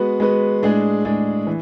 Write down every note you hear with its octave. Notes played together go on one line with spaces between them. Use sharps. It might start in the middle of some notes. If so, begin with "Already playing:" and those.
Already playing: G#3 B3 F#4 B4
G#3 B3 F#4 B4
A2 G#3 D4 G#4
A2 G#3 D4 G#4
E3